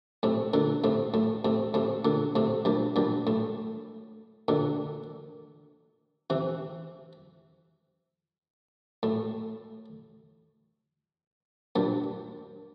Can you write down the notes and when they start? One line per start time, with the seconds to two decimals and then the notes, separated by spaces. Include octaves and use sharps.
0.23 A2 C3
0.54 A#2 D3
0.84 A2 C3
1.14 A2
1.45 A2 C3
1.74 A2 C3
2.05 A#2 D3
2.36 A2 C3
2.65 G2 A#2
2.96 G2 A#2
3.27 A2
4.48 A#2 D3
6.30 C3 E3
9.03 A2
11.76 G2 A#2